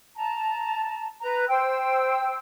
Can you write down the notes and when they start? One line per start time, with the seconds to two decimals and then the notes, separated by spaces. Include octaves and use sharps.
0.16 A5 A#5
1.21 B4 A#5
1.49 C5 G5 E6